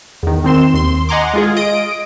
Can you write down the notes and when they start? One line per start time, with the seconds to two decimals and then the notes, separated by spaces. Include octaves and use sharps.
0.23 E2 D#3
0.44 D#3 C4 C6 E7
0.74 D#2 C6
1.09 D#5 F#5 G#5 A#5 C6 D6
1.34 G#3 F4 G#4
1.56 D#5 D#6 D7